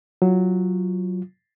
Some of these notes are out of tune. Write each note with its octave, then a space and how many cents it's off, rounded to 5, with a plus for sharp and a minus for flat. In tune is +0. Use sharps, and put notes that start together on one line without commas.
F#3 +0 F4 +0